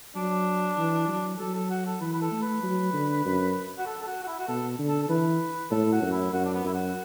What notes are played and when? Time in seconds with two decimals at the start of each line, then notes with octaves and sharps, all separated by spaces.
0.16 F#3 D4
0.77 E3
1.08 F#3
1.39 F#3 A4
1.55 A4
1.70 F#4
1.86 A4
2.01 E3 B4
2.12 B4
2.22 A4
2.32 A3
2.42 B4
2.63 F#3
2.93 D3
3.25 F#2
3.78 F#4
3.86 A4
4.02 A4
4.07 F#4
4.23 F#4
4.27 E4
4.39 F#4
4.48 B2 A4
4.79 D3
4.89 A4
5.03 A4
5.09 E3 B4
5.71 A2 A4
5.92 F#4
6.02 F#2
6.12 E4
6.33 F#2 F#4
6.45 D4
6.54 B3
6.64 F#2 E4
6.74 F#4